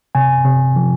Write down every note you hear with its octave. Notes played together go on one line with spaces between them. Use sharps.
C3 G#5
C3
F3